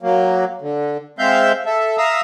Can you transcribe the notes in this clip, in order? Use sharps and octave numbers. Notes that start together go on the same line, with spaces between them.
F#3 A#3
D3
G#3 C4 E5 F5 G6
A4 E5
E5 F5 A#5 D#6 E6